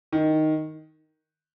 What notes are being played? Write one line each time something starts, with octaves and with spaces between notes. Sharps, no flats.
D#3